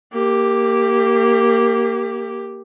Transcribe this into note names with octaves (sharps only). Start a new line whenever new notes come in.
A#3 G4